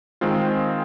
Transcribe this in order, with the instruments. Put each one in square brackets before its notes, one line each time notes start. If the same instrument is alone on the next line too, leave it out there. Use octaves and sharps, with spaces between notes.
[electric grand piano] D#3 G#3 C4 F4